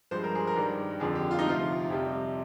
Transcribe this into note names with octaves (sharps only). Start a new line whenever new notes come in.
G2 F3 G#3 C5
A#4
G#4
A#4
G2 D#3 G3
F2 D3 F3 G#4
G4
F4
D#4
D2 C3 F3 F4
F2 C3 G3